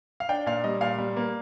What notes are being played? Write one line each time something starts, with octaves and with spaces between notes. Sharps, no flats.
F5
D4 G5
A#2 F5
G3 D#5
A#2 F5
G3
A#3